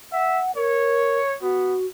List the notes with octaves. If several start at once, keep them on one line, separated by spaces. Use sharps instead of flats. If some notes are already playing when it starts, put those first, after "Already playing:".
E5 F#5
A#4 C#5
B3 F#4